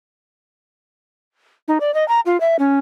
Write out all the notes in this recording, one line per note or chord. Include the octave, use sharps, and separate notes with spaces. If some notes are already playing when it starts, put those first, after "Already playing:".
D#4
D5
D#5
A#5
F4
E5
C#4